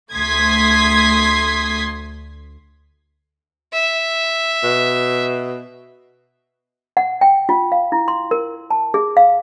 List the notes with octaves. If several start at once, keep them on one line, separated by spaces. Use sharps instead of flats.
D2 A3 C6 D#6 G#6 B6
E5
B2
F#5
G5
F4
F5
E4
C6
A#4
A5
G#4
F5